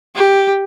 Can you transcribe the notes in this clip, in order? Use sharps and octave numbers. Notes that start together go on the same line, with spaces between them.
G4